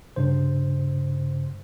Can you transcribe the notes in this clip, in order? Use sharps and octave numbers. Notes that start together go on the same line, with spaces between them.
G2 C#3 C5